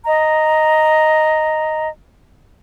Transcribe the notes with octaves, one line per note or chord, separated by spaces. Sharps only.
D#5 A#5